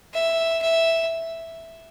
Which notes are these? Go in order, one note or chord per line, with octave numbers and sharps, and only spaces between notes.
E5
E5